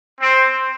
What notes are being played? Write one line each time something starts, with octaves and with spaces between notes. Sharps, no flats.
C4